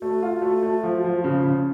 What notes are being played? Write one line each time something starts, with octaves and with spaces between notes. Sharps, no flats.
A3 F#4
F4
A3
A3
F3
F3
C#3
C#3